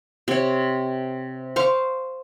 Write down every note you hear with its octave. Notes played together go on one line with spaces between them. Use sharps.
C3 C#5
C5 F5 C#6 D6